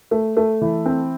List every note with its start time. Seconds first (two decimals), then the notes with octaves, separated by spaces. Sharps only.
0.11 A3
0.37 A3
0.61 E3
0.86 C4